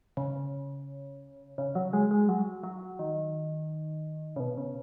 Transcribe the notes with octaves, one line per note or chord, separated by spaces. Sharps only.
C#3
C#3
F#3
G#3
G#3
F#3
F#3
D#3
C#3
B2
C#3